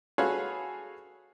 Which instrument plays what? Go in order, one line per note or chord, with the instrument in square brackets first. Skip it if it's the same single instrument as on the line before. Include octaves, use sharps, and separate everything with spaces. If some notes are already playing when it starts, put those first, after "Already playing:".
[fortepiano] F#4 G#4 A4 B4 C#5 F5